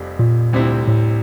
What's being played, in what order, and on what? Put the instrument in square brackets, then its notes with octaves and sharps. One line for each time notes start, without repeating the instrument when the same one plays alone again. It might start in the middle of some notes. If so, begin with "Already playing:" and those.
Already playing: [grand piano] F1 F2 C3 G3
[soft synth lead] A#2
[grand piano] D2 C3 G3 C4 E4
[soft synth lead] A2